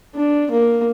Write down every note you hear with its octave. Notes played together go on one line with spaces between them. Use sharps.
D4
A#3